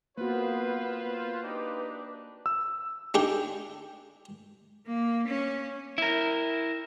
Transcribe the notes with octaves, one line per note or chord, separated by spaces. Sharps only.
A#3 B3 F4 F#4 B4 C5
D4 D#4 G4 B4
E6
D4 D#4 G4 G#4
A#3
C#4
E4 A#4